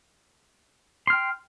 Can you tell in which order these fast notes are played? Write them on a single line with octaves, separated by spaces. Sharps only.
C6 F6 G5